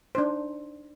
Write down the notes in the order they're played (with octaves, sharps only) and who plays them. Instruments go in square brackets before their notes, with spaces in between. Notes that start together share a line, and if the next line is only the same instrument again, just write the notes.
[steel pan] D4 D#4 C5